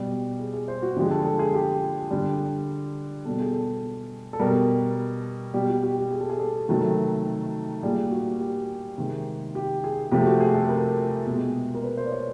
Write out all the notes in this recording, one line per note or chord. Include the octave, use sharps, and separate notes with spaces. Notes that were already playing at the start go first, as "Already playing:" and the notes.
Already playing: B2 G3 D5
G#4
G#4
C5
F#4
D3 F3 G#3 G4
A4
A4
G#4
G4
D3 G3
B2 G3 A4
G#4
A4
A4
B2 G3 A#4
B2 G3 G4
F#4
G4
G4
G#4
A4
G#4
A4
C3 D#3 F#3 A3
A#2 G3 G#4
F#4
G4
C3 D#3 G#3
G4
G#4
C3 F3 A3 G4
F#4
G#4
A4
A#4
B2
G#3
A#4
B4
C5
D5
C#5